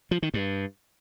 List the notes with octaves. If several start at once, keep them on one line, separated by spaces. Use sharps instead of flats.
F3
D#3
G2